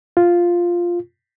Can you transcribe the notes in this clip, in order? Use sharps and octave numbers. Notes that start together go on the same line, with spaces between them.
F4